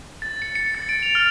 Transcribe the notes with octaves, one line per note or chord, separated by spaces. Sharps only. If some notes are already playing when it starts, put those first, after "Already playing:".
A6
C#7
C#7
A6
D7
F7
F6